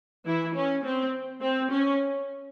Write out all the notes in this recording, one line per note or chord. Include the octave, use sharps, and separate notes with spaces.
E3 E4
C#4
C4
C4
C#4